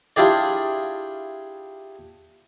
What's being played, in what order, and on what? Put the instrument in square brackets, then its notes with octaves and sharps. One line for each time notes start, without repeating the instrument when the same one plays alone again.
[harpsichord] D4 E4 F4 G4 G#4 D5